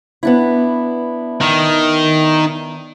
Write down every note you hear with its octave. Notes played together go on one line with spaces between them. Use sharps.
B3 D4 E4
D#3